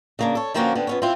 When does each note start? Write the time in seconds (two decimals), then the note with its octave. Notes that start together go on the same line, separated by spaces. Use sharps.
0.19 C#3 A#3 D4
0.35 A4 C#5
0.54 D3 F3 A#3 C4 C#4 F#4
0.75 D3 B3 C4
0.87 F2 B3 C#4
1.02 C4 E4 F4